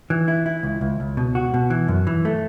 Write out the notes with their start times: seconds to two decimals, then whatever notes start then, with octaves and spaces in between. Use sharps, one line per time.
0.10 E3
0.28 E4
0.46 E4
0.63 C#2
0.81 C#2
1.00 C#2
1.17 B2
1.35 F#4
1.54 B2
1.70 E3
1.88 F#2
2.07 E3
2.25 A3